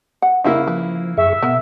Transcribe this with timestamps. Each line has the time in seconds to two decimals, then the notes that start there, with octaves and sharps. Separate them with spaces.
0.22 F#5
0.44 C#3 G3 A#3 E4 C5 E5
0.67 F3 B4
1.17 F#2 G#4 E5 C#6
1.42 B2 B3 A#4